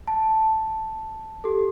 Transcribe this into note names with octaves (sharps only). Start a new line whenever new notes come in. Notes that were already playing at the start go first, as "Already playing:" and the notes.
A5
G4 A4